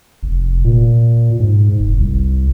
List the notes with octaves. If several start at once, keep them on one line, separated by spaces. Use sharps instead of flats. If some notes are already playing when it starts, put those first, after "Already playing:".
F1
A#2
G#2
F1
C2